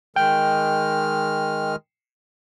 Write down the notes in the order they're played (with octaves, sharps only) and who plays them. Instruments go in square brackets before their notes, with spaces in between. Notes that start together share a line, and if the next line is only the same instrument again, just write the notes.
[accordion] D#3 G#3 F6 [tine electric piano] G5